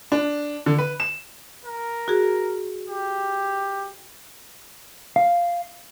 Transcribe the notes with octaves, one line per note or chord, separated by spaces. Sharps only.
D4
D3
B4
E7
A#4
F#4 G#4
G4
F5